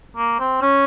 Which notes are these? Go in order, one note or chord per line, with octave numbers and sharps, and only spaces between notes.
A#3
C4
C#4